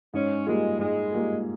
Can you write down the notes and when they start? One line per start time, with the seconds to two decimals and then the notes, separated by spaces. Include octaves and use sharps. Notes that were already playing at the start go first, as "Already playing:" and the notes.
0.14 G#2 C#4
0.46 G3 G#3 A#3 F4 G#4
0.79 G#2 G#3
1.12 G3 A#3 F4 G#4